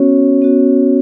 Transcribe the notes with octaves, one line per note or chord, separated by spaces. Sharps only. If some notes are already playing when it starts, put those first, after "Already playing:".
Already playing: B3 C#4 F#4 C#5
B3 F#4